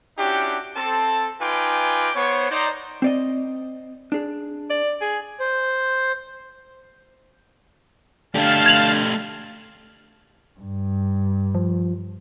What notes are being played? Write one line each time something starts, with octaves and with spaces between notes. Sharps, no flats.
C#4 D4 E4 F#4 G4
C4 A4 A5
D#4 F4 B4 G5 G#5 D6
B3 C5 C#5
D#4 C5 D5
C4 D5 D#5
D4 G#4
D5
G#4
C5
D3 A3 G4 F5 A5
G#6 F7 F#7
G2
F3